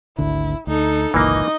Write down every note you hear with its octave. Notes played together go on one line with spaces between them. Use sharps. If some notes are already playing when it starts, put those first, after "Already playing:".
G#1 D2 D3 E4
D2 D#4 A4
G1 C#2 A#2 E3 A#3 D#4 D#5